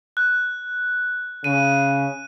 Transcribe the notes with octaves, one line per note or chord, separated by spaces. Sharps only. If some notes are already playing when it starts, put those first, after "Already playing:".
F#6
C#3 D#7